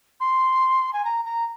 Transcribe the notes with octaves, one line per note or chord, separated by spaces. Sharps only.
C6
G#5
A#5
A#5